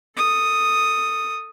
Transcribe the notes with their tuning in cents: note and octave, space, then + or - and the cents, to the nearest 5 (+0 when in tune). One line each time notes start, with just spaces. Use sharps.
A4 +20 D#6 +0